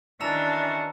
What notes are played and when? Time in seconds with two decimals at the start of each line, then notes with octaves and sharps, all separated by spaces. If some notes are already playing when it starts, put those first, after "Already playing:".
0.21 D#3 E3 C#4 D4 F#4 A5 A#5 E6